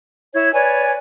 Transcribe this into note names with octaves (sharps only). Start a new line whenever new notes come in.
E4 C#5 G#6
B4 C#5 D5 G#5